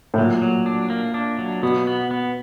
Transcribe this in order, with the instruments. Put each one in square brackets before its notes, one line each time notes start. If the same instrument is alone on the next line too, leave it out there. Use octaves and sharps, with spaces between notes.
[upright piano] A2
[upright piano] A#2 [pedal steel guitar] F#3
[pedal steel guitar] F#3
D4
A#3
D4
F#3
[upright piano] B2 [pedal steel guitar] B3
[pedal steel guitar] B3
B3